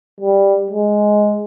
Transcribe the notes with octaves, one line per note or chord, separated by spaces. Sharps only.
G3
G#3